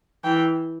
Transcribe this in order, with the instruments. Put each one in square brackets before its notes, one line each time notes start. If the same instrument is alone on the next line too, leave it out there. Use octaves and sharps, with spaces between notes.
[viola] E3 [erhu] G5